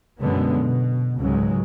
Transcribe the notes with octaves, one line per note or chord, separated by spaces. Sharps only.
F#2 B2 D3 G#3 B3
B2
C#2 G#2 C#3 F#3 G#3